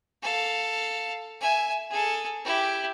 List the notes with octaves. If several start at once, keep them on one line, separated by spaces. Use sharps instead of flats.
A4 F5
E5 G#5
G#4 A4
E4 G4